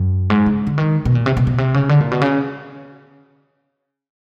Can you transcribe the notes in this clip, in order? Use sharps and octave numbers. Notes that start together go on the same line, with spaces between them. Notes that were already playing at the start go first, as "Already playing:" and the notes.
Already playing: F#2
G#2
C#3
D3
D#3
B2
A#2
C3
B2
B2
C3
C#3
D3
A#2
B2
C#3